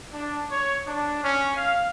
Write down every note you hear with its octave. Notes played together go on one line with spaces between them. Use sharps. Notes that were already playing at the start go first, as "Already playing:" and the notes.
D4
C#5
D4
C#4
F5